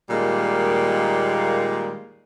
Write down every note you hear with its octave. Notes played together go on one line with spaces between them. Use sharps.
A#2 D#3 G3 G#3 A#3